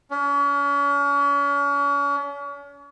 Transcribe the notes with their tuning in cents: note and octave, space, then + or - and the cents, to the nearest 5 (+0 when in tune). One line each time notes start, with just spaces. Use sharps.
C#4 +40